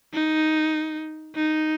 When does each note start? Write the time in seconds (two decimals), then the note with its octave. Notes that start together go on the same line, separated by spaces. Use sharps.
0.13 D#4
1.35 D#4